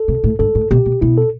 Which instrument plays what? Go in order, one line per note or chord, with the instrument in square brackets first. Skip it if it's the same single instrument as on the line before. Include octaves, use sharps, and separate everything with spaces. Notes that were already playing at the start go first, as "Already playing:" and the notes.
Already playing: [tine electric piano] A4
[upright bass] C3
A2
[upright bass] G2 [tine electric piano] A4
[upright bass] A2
[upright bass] B2 [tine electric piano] G4
[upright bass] B2
[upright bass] B2 [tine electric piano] E4
[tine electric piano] A4